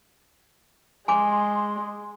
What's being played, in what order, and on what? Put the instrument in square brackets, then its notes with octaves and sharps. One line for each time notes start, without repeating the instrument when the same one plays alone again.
[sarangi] G#3 [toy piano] G#5 D6 [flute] C6